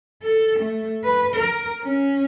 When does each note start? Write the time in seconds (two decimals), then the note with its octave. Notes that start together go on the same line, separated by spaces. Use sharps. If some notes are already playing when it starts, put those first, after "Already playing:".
0.23 A4
0.59 A3
1.04 B4
1.35 A#4
1.83 C#4